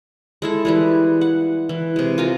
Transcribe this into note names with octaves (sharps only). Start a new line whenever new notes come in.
G#3 E4 A4
E3 G3 G#3
F#5
E3
C3 G#3
F4 A#4 G#5 A#5